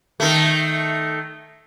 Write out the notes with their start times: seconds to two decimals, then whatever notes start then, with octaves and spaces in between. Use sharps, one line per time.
0.20 D#3 A3